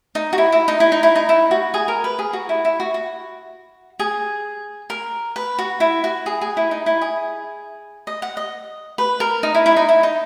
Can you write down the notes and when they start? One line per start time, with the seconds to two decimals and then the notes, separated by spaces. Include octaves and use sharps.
0.15 D#4
0.33 F#4
0.38 E4
0.52 E4
0.68 D#4
0.80 E4
0.92 D#4
1.03 E4
1.16 D#4
1.29 E4
1.51 F#4
1.74 G#4
1.88 A#4
2.04 B4
2.19 G#4
2.33 F#4
2.49 E4
2.65 E4
2.80 F#4
2.94 F#4
4.00 G#4
4.90 A#4
5.36 B4
5.59 F#4
5.80 E4
6.04 F#4
6.26 G#4
6.41 G#4
6.57 E4
6.71 D#4
6.86 E4
7.01 G#4
8.07 D#5
8.22 F#5
8.37 D#5
8.98 B4
9.20 A#4
9.43 D#4
9.54 E4
9.66 E4
9.76 D#4
9.89 E4
10.03 D#4